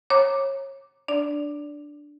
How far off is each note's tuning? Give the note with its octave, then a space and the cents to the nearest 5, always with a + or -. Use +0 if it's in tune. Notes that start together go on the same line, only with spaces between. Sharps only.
C#5 -25 A#5 +0 D6 +0
D4 +0 D5 -20